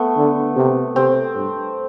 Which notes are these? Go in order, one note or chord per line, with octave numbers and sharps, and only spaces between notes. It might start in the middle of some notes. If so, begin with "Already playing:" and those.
Already playing: A3 B3
D3
C3
C3 C4
G2